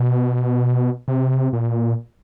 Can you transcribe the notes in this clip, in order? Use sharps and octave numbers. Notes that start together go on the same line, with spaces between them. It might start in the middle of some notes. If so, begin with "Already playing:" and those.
Already playing: B2
C3
A#2